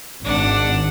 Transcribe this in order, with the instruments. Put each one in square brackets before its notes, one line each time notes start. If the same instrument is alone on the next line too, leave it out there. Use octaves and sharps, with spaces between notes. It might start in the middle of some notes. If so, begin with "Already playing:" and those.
[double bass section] G#1 [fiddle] D4 F#5